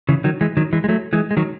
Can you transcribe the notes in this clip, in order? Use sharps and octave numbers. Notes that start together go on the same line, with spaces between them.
C#3 E3
D#3 F#3
E3 G#3
D#3 F#3
E3 G#3
G#3
F#3 A3
E3 G#3
G#3
D#3 F#3